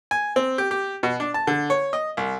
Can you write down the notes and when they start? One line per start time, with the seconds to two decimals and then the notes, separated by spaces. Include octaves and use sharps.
0.11 G#5
0.36 C4
0.58 G4
0.71 G4
1.03 B2
1.20 D4
1.34 A5
1.47 D3
1.70 C#5
1.93 D#5
2.17 C2